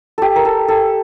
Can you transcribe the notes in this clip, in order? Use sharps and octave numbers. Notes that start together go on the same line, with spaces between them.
G4 A4
A#4
A4
A4